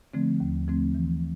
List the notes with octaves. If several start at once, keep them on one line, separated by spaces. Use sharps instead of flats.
D3 F3 A3 C4
D#2
D3 F3 A3 C4
E3